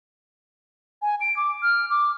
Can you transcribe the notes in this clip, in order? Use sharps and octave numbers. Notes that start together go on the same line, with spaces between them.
G#5
D7
D6
F6
D6